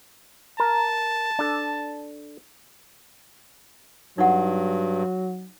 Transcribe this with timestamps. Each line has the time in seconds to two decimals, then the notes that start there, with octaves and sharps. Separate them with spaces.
0.60 A#4 A5
1.39 D4 A4
4.18 G2 F#3 D#4 F#5